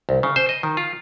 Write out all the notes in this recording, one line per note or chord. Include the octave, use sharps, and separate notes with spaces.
C2
C#3
C5
D#5
D#3
F4